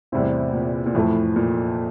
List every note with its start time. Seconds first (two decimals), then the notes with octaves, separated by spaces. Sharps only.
0.12 E2 A2 C3 G3 C4 E4
0.53 A#2
0.86 A#2
0.95 F2 A2 E3 A3
1.36 A#2